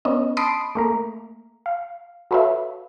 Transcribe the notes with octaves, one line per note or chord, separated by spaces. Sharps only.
B3 C#4 D4 D#5
A5 B5 C6 D#6 C7 D7
A3 A#3 A#5
F5
F#4 A4 B4 C#5 E5 F5